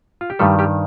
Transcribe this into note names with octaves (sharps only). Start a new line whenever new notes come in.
F4
G4
G2 D#3 G3 A3 A4
G3 G4